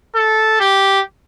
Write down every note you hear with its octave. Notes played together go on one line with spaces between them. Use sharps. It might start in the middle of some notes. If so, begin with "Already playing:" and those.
A4
G4